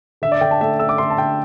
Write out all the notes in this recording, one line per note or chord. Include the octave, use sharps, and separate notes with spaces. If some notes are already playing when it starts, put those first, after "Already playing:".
D3 E5
D5
D3 G5
A5
A3 E5
A3 E6
D6
D3 C6
A5
D3 G5